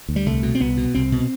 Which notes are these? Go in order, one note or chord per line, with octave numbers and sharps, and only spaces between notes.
D2
G3
C2 A3
B2
C4
C2 B3
B2
C2 C4
B2